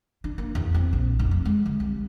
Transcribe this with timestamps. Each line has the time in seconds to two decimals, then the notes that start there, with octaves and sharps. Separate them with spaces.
0.24 D4
0.38 A#3
0.55 E2
0.74 C4
0.93 A#1
1.19 F1
1.31 F2
1.45 G#3
1.66 D3
1.80 C2